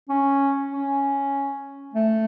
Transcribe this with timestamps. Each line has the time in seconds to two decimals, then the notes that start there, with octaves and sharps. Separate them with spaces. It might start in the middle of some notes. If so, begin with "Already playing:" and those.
0.09 C#4
0.71 C#4
1.94 A3